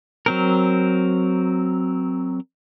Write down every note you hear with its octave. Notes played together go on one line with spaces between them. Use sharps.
F#3 C4 A#4